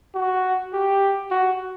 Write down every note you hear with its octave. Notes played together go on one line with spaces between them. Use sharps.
F#4
G4
F#4